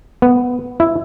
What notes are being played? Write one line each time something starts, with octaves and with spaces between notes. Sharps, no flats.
B3
E4